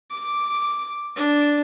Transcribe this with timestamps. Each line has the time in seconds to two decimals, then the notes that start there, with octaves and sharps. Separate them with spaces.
0.11 D6
1.16 D4